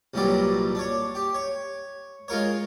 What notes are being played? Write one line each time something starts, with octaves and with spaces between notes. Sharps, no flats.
C2 A#2 E3 F#3 G3 D5
D4 C#5
G4
C#5
G#3 F4 A#4 C#5